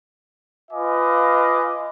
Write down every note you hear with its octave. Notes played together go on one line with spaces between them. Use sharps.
F4 B4 D#5 F5 G#5 D6